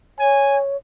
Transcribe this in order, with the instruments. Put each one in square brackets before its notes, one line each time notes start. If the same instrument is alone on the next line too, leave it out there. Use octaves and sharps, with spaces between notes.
[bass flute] C#5 [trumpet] G#5